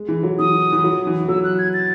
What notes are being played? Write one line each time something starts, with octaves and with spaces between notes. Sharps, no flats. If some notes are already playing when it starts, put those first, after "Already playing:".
Already playing: G#3
E3
F#3
E3 D#6
E3
F#3
E3
F#3 E6
F#6
G#6
A6